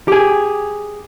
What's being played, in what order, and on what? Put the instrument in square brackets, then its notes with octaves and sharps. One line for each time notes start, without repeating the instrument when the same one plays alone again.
[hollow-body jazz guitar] G4 G#4